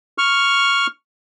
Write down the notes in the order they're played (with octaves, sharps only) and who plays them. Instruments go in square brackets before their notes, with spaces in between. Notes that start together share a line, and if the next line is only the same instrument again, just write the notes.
[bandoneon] C#6 F6